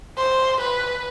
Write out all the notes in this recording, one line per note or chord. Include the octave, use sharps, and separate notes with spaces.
C5
B4